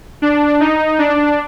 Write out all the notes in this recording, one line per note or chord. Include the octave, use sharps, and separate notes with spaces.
D4
D#4
D4